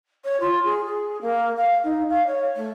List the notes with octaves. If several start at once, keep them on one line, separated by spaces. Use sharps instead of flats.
C#5
F4
G#4
G#4
A#3
F5
D#4
F5
C#5
A3